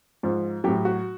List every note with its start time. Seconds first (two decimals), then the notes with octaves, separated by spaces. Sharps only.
0.23 G#2 F3
0.64 A2 F#3 G4
0.85 F#4